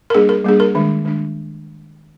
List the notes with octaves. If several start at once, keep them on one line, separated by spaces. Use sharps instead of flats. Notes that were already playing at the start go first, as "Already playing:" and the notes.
A#4
G3 A#3 D4 G#4
A#4
G3 A#3 D4 G#4
A#4
D#3 G#3 D4
D#3 G#3 D4